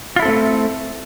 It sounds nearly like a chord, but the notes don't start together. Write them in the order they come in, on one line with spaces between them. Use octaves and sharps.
F4 E4 A4 C4 A3